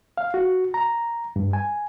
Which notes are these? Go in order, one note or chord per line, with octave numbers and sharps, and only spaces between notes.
F5
F#4
A#5
G2
G#5